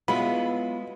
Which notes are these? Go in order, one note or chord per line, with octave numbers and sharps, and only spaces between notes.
F#3 G#3 B3 E4 F4 B5